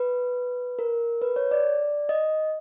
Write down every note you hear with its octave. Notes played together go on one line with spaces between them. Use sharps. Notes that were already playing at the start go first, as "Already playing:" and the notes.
Already playing: B4
A#4
B4
C#5
D5
D#5